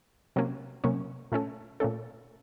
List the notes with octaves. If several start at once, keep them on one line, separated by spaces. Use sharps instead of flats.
C3 F#3 A#3 C#4
C3 F#3 A#3 C#4
A#2 A3 C#4 A4
A#2 A3 C#4 A4